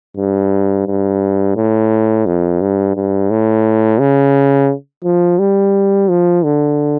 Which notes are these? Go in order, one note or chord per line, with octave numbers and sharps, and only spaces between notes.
G2
G2
A2
F2
G2
G2
A2
C#3
F3
G3
F3
D3